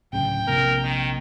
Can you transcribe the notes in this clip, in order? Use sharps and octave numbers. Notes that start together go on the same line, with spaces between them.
D1 C#3 G5
A#1 C3 A#3 A#4
D#3